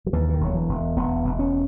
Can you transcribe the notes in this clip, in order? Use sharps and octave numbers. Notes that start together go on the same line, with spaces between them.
F#3
D#2 E3
E3
D#3
E1 F#3
E3
E1
E1 B3
E1
C#4